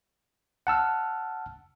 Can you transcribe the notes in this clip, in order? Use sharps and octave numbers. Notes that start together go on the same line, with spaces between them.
F#5 A5 E6 F6